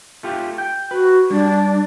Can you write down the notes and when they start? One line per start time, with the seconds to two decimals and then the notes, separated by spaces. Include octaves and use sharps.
0.23 A3 F4 G4
0.58 G5
0.91 F#4 B4
1.30 G3 D4